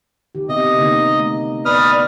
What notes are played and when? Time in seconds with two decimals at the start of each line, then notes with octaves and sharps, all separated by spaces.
0.35 D#3 G4
0.49 C3 B3 D#5 E5
0.76 D3 A#3 D#4
1.11 C3 A3
1.65 B3 B4 D5 D#6 F6